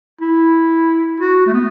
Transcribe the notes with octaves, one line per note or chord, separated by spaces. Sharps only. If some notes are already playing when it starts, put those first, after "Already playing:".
E4
F#4
A3
B3